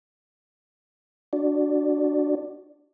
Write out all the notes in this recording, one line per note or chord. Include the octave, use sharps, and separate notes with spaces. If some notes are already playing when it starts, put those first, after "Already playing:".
D4 F#4 D5